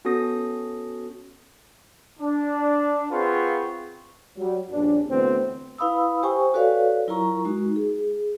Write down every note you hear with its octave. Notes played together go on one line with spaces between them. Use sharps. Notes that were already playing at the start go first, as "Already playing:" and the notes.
B3 C#4 F#4 A4 D#6 A#6
D4
C4 F4 G#4 B4 F#5 C#6
F#3 G3
A#1 G2 C#4 D4
D2 A2 E3 B3 C4
E4 B4 F5 B5 D#6 E6
G4 C5 G5 G#5 C#6
F#4 A4 B4 C#5 D5 F5
F#3 E4 F4 A#4 A#5 C#6
G#3 D#4 F#4
G#4